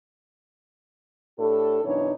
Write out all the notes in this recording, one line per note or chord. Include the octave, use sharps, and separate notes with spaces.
A2 D4 G4 A4
F#2 B2 E3 D4 D#4 C#5